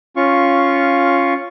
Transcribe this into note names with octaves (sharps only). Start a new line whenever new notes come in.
C#4 F4 F5 C#6